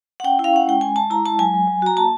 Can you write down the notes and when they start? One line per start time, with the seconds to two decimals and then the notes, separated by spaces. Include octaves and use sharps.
0.20 F#5
0.24 C#4 G5
0.39 E4 F5
0.53 C#4 F#5
0.68 G#3 G5
0.81 G#3 G#5
0.96 G#3 A5
1.10 E4 A#5
1.25 G#3 A5
1.39 F#3 G#5
1.54 F#3
1.67 F#3
1.82 F#4 A#5
1.97 A#3 A5